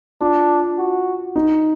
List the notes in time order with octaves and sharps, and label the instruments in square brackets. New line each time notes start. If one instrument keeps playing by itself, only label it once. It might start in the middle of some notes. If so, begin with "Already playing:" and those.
[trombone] D4 [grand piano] F4
[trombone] F#4
[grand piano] D#4